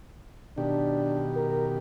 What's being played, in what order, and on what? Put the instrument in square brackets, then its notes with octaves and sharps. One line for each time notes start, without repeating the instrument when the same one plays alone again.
[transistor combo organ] B2 D#3 G4 [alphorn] D4
[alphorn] A#4